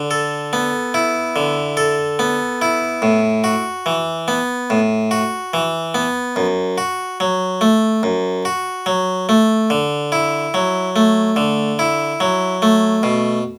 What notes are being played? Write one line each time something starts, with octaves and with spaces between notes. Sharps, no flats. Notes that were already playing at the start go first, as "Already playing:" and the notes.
Already playing: D3
A4
B3
E4
D3
A4
B3
E4
A2
F#4
E3
B3
A2
F#4
E3
B3
F#2
F#4
F#3
A3
F#2
F#4
F#3
A3
D3
E4
F#3
A3
D3
E4
F#3
A3
B2